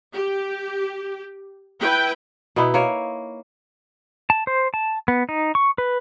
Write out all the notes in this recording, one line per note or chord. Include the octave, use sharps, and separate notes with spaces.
G4
E4 B4 G5
B2 B3 D#4 E4
A#3 C#5
A5
C5
A5
B3
D#4
C#6
B4